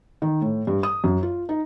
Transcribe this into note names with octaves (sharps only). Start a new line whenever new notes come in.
D#3
A2
G2
D#6
F#2
F4
D#4